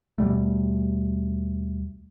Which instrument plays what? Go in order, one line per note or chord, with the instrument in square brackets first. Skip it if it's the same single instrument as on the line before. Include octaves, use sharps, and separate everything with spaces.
[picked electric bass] D#2 B2 G3 A3